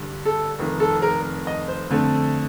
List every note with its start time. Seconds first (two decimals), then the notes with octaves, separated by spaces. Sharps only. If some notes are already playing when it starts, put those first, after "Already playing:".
Already playing: G2 D3 G3
0.25 A4
0.59 F1 F2 D#3
0.80 A4
1.02 A#4
1.47 D#5
1.68 C5
1.90 F2 D3 A3 C4